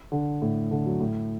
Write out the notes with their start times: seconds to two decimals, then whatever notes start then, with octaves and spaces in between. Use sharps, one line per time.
0.12 D3
0.42 A2
0.71 D3
0.86 F#3
1.00 A2